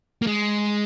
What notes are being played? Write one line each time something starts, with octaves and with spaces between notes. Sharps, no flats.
A#3
G#3